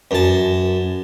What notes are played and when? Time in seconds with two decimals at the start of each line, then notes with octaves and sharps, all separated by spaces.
0.11 F#2 A5